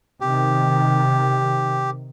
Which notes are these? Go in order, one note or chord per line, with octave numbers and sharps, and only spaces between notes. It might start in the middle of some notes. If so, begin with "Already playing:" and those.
C3 D#3 G4